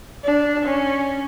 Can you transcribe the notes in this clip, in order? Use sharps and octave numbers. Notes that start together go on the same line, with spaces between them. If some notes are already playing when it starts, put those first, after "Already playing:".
D4
C#4